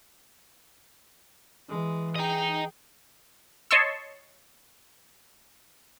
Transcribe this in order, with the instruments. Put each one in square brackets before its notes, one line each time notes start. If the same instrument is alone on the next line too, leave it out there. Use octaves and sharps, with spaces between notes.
[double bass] E3 [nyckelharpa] G#3
[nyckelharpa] G#4 G5 [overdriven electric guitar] D#5 A#5
[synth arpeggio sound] C#5 D#5 A5 C6 C#6 E6